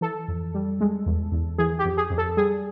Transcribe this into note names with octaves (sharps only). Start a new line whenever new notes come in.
E3 A4
F2
G3
G#3
E2
E2
E3 G#4
G4
F2
G#4
F2
A4
G3 G#4